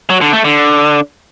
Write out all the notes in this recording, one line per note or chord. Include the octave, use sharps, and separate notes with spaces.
F#3
D3
A3
D3